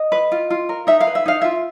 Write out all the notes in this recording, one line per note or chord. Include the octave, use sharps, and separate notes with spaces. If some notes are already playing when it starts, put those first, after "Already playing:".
Already playing: D#5
B4
F4
F4
A#4
D#4 E5
F5
B4
E5
D#4 F5
F4 E5